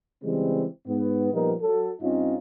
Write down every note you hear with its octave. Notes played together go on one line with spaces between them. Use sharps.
C#3 E3 G3 G#3 C4
G#2 B3
A#2 F3 G3 B3 D#4 A#4
F#3 A4
G2 C4 C#4 D#4 F4